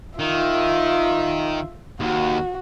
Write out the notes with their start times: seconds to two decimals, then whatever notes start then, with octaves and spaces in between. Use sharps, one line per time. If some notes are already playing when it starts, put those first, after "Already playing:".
0.19 D#3 F4 E5
2.00 D#2 F#4